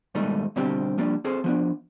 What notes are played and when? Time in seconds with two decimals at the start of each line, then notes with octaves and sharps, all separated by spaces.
0.15 G#2 B2 D#3 G3 A3 D#4
0.56 B2 D3 G3 C4 G4
0.98 F3 G3 A#3 D4
1.25 C4 G#4 A4 C5
1.44 F3 B3 D4